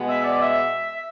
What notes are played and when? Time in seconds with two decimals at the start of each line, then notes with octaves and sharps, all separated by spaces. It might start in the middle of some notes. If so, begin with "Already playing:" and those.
Already playing: B2 G#3 B3
0.08 E5
0.24 D5
0.41 E5